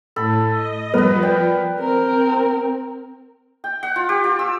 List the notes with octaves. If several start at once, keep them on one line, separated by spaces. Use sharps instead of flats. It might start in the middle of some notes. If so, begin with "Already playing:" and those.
A2 A4 B5
D#5
F3 G3 B3 A#4 B4
B4 D5 G5
C4 A#4
G5
F#5
F4
G4
F4
E6